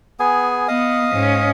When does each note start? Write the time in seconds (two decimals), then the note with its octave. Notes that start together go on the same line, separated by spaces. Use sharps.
0.20 B3 G#4 G#5
0.68 B3 D#5 F5 D#6
1.12 G#2 C#4